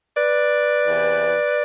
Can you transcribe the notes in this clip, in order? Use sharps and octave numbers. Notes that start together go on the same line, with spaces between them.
B4 D5
E2 C3 E3